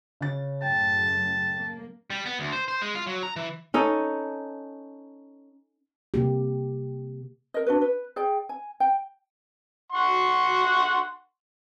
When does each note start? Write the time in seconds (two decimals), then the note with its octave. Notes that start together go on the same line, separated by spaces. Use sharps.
0.21 C#3 C#4 A6
0.62 F#2 A2 C#3 G5 A5
1.56 A#3
2.10 G3
2.26 B3
2.39 D2
2.52 C5
2.68 C5
2.82 G#3
2.95 F4
3.07 F#3
3.23 A#5
3.36 E3
3.74 C#4 D#4 A4
6.14 C3 A#3 G4
7.54 A#4 D#5
7.67 D4 F#4 B4
7.81 B4
8.16 G#4 D5 G5
8.49 G#5
8.80 G5
9.92 F#5 C6 C#6